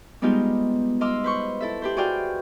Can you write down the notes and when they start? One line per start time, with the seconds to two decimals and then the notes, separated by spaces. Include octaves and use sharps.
0.22 G3 G#3 B3 D#4 F4 G4
1.01 D#5 F5 C6 D6 E6 F6
1.24 B4 C5 C#6
1.60 E4 A4 E5
1.82 G4 B4 C5
1.97 F#4 G#4 D5 F5 G5